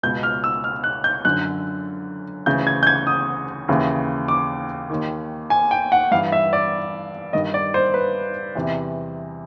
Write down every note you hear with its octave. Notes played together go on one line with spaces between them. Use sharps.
C#2 B2 G6
F6
E6
F6
F#6
G6
F#2 D3 F#6
D2 C#3 E3 G6
G#6
G6
G#6
D#6
D#2 C#3 E3
D6
D#2 D#3
G#5
G5
F#5
G2 E3 F5
E5
D5
G2 D#3 D#5
D5
C5
B4
E2 C3 E3